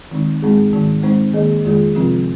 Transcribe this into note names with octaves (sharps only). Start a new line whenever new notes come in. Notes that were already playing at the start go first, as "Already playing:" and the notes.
D#3 G#3 C4 D#4
G#2 G#3 C4 D#4 G#4
G#2 D#3 G#3 D#4
G#3 C4 D#4 C5
D#3 A#3 G#4 D#5
F2 D#3 G#3 F4 G#4
C3 F3 C4 F4